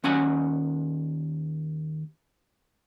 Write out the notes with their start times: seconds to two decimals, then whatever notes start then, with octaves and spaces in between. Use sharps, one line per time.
0.04 D#2 C#4 F#5 G#5